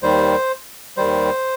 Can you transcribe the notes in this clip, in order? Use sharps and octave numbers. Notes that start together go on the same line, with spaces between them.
D#2 D#3 G3 C5
D#2 D#3 G3 C5